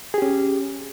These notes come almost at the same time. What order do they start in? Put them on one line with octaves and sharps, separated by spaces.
G#4 G4 C#4